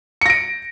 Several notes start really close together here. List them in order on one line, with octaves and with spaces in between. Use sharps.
C#7 A#6 D7